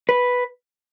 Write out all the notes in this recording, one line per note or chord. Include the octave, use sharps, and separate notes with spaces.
B4